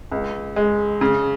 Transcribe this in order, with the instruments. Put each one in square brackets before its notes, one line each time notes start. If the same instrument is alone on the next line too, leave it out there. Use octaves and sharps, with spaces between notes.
[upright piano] C#2
G#3
C#3